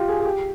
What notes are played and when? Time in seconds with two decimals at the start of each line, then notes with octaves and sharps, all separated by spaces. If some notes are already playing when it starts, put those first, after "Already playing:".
Already playing: F4 G4
0.08 G#4
0.20 G#4
0.25 G4